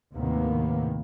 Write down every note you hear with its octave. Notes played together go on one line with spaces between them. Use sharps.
D#2 A2 C3 D#3 A#3 B3